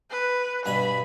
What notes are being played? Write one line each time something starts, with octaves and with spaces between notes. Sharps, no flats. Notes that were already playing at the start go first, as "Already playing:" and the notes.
B4
G2 B2 G#5 B5